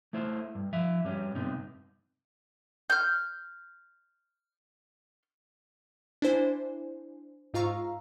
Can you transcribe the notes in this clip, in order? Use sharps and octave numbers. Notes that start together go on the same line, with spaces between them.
A3 E4 C5
G2
F3 E5
G2 G3 C#4
G2 C3 B3 D#4
F6 G6
D4 E4 C5 G#5
G#2 F4 F5 A#5 C#6 E6